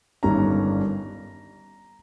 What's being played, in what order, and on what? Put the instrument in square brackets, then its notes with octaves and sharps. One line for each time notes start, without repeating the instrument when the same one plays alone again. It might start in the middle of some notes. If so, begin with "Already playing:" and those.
[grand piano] G1 G2 D#3 G3 C#4 A#5